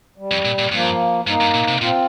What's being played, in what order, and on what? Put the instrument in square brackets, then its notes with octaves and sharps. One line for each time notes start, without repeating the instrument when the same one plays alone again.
[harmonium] G3
[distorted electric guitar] F2
A#2
A#2
[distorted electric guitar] G2 [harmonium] F3 A#3
[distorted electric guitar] G2 [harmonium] A#3 D#4
[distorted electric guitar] G2
A#2
C3
[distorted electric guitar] A#2 [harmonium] C4 F4